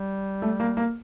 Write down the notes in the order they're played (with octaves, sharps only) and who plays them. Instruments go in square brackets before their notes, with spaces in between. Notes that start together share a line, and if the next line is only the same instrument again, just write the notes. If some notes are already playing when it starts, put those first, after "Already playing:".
Already playing: [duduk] G3
[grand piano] A3
A#3
A#3